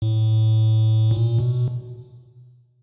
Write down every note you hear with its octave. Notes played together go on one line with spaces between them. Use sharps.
A2
A#2
B2